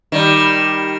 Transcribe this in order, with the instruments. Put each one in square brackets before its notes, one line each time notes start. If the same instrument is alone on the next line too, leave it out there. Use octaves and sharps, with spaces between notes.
[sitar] D#3 G3